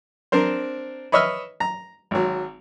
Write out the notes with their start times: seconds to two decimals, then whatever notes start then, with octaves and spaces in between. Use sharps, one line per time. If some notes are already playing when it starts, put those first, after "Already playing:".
0.32 C4 D4 A#4 C5
1.12 B4 C#5 D#5 E5 E6 F6
1.60 A#5
2.11 G#1 F#3